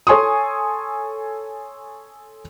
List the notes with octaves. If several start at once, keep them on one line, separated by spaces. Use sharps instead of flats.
A4 C#5 G#5 C6 C#6 D#6